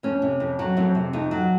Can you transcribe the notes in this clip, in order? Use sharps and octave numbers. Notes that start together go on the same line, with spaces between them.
F2 C#4
C3
F2
F#3
F2 C4
C3
F2 D#4
F#3